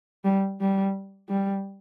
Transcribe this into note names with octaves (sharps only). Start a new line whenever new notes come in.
G3
G3
G3